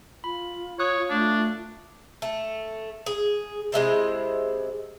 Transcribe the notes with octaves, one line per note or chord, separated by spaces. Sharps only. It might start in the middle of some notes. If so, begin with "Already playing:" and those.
F4 B5
C#5 C#6 D#6 F#6
A3 D4
A3
G#4
C3 G#3 E4 C5